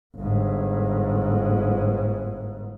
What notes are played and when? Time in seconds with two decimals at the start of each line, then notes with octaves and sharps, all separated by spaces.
0.17 G1 G#2